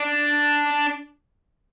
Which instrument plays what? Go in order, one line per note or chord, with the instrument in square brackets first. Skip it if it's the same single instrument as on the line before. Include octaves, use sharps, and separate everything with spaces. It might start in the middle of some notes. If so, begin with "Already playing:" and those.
Already playing: [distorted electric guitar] D4